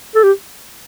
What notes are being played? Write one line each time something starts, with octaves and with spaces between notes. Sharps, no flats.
A4
G4